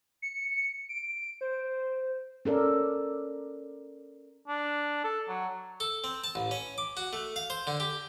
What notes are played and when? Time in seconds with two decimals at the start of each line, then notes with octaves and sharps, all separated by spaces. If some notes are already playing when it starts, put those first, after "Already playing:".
0.22 C#7
0.89 D7
1.41 C5
2.45 C#4 A4 A#4 D5
4.48 D4
5.04 A4
5.28 F#3
5.80 A4
6.04 C4
6.24 A5
6.35 A1
6.51 C#4
6.78 D6
6.97 F#4
7.13 A3
7.36 F5
7.50 C5
7.67 D3
7.80 G4